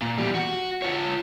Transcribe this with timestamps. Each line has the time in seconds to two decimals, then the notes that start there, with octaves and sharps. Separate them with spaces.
0.02 A#2
0.18 E2 G3
0.35 F#4 F#5
0.82 F4 C#5